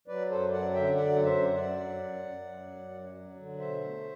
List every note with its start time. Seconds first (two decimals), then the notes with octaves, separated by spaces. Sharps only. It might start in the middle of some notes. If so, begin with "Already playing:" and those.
0.08 F#3 B4 D5
0.30 F#2 A4 C5
0.52 F#3 D5 F#5
0.73 D3 E5 G5
0.95 F#3 D5 F#5
1.17 F#2
1.25 C5 E5
1.39 F#2
1.54 D5 F#5
1.62 F#3
1.84 F#2
2.05 F#2
2.27 F#2
2.49 F#3
2.71 F#2
2.93 F#3
3.15 F#3
3.36 D3
3.59 B2 C5 E5
3.80 A3